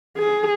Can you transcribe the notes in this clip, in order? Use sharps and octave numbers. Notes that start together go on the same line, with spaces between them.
G#4